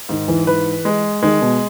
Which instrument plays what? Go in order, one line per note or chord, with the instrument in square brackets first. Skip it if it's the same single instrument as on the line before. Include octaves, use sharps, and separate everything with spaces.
[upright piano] G#2 [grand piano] D#3
[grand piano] E3
[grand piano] E3 [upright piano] B4
[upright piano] G#3
[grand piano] D#3 [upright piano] G#3
[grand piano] B2